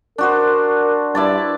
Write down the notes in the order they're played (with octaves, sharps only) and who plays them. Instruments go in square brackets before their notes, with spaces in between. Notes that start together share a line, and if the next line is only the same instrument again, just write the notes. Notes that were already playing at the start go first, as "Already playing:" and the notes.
[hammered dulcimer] D4 F#4 C5 [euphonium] A#4
[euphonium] G2 [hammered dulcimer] E4 D5 A5